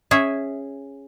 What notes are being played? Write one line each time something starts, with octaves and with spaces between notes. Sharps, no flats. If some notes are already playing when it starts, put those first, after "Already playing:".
C#4 G#4 E5